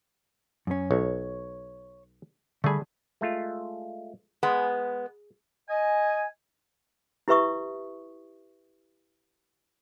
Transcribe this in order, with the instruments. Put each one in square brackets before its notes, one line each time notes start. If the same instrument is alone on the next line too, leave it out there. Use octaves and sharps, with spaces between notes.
[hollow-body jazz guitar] F#2 C#4
[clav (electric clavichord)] B1 [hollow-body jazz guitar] C#5
[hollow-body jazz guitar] D3 G3 B5 [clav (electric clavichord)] A3 G#4
[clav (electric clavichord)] G#3 A3 F4
[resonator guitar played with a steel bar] G#3 B3 [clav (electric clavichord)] G#4
[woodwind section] D#5 G#5
[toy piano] E4 G4 B4 E5 C#6 D#6